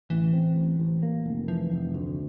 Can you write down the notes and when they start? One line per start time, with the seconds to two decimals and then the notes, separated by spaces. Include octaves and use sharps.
0.10 A1 E3
0.33 C4
0.56 A1
0.80 A1
1.03 A#3
1.26 F1
1.48 E3 F3
1.71 F1
1.94 D2